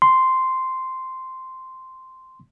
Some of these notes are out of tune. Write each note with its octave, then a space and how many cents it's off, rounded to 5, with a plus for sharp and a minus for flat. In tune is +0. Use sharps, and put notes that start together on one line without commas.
C6 -5